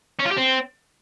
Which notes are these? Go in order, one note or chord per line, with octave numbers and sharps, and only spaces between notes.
C#4
F4
G4
C4